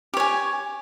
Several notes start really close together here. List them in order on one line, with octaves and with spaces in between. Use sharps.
G4 C#5 G#5